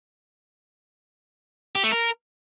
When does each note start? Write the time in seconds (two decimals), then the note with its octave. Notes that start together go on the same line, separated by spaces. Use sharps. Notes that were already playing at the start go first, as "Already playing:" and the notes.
1.75 G4
1.84 A3
1.92 A#4